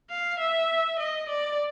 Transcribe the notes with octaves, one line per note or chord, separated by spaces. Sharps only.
F5
E5
D#5
D5